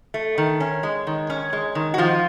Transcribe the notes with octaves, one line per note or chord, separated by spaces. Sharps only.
A3
D#3
C#4
G#3
D#3
C#4
G#3
D#3
F#4
D#3 F3 F4